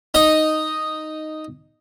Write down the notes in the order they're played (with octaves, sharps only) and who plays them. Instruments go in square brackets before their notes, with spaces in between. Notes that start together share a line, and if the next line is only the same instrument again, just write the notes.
[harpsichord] D#4 D#5